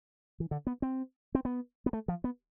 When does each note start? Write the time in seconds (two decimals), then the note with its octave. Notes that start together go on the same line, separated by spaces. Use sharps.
0.40 E3
0.51 D3
0.67 B3
0.82 C4
1.35 C4
1.45 B3
1.86 B3
1.93 A3
2.08 F3
2.24 B3